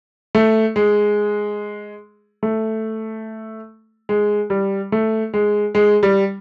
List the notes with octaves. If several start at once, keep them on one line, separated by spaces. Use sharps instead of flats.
A3
G#3
A3
G#3
G3
A3
G#3
G#3
G3